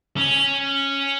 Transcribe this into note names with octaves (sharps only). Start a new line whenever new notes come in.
C#4